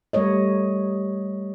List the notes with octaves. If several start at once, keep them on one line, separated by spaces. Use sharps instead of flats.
G3 A3 A#4 C#5 D#5